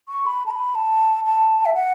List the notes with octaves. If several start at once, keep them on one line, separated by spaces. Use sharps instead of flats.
C#6
B5
A5
B5
A5
A5
E5
F#5